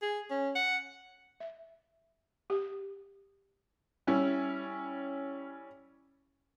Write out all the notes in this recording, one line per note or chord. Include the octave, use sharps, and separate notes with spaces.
G#4
C#4
F#5
E5
G4
G3 C#4 E4